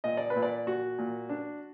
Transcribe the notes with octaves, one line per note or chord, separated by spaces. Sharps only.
A#2 D#5
D5
B4
A#2
D5
A#2 F#4
A#2
D4